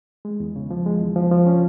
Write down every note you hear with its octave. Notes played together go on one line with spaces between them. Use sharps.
G#3
E2
C#3
F3
G#3
E2
F3
F3
C#4